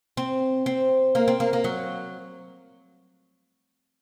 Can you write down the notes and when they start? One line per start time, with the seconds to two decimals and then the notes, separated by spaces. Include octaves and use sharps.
0.17 C4
0.66 C4
1.15 A#3
1.28 C4
1.40 A#3
1.53 A#3
1.64 F#3